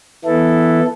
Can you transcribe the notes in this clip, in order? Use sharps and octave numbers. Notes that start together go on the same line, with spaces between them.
E3 B3 E4 A4